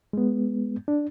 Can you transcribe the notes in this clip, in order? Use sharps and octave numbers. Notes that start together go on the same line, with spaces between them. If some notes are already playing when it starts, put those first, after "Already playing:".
G#3 B3
D4